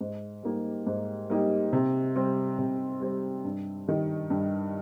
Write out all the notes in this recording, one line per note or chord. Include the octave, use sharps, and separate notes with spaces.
G#2
G3 A#3 D#4 G4
G#2
G3 A#3 D#4 G4
C3
G3 C4
C3
G3 C4
G2
D#3 G3
G2